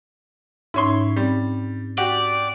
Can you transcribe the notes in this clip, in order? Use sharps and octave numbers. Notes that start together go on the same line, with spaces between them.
G#2 C#4 D#4 E4 C#5 C6
G3 C4
F#4 G4 D5